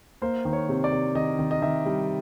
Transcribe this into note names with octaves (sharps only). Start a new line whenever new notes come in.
A#3 C5
D#3
C#5
C3
D5
C3
D#3 D#5
D#3
D#5
D#3 E5
G3